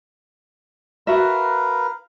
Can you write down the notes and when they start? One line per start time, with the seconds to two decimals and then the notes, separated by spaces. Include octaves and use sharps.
1.07 F#4 A#4 B4 E5 F5